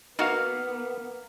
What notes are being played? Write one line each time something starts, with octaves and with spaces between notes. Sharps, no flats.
A#3 B3 D#4 F#4 F5